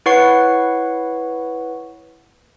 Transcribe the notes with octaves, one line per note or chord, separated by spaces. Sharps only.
E4 B4 C#5 F#5 C#6 C7